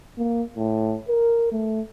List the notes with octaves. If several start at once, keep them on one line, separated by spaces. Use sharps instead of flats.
A#3
A2
A#4
A3